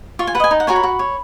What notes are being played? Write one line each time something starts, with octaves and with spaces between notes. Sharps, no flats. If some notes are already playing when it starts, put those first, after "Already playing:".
F4 C#6
G#5
B4 F#5
D#5 G#5
D#4
F#5
F#4 A#4 C#5 G#5
B5
F#4
C#5